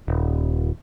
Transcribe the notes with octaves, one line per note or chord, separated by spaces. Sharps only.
D#1